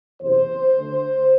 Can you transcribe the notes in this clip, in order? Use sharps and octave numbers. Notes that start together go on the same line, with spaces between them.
F#1 E2 C3 C5
D2 D3 A3